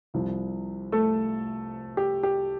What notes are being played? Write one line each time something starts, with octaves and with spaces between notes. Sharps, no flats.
C2 C3 F3
A3 A4
G4
G4